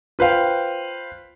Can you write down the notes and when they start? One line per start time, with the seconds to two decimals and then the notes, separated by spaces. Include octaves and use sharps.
0.19 F4 B4 C5 F5 G5